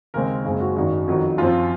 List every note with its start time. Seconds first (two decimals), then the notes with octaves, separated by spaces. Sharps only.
0.14 D#2 C#3 G#3 C4 A#4
0.44 F#1 F#2 C#3 G#3 C4 G#4
0.61 F#4
0.76 G#1 F#2 D#3 A#3 F#4
1.08 F2 D#3 F#3
1.38 F#2 F3 C4 F4